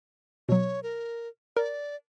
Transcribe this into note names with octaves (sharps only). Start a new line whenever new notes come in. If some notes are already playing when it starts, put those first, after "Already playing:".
B2 F#3 C#5
A#4
A#4 D5